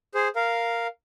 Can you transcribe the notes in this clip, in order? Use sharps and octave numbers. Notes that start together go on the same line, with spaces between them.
G#4 C5
A#4 F5